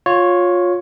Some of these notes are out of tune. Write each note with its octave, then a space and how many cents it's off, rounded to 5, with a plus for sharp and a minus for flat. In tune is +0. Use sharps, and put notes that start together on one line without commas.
F4 +20 C#5 +0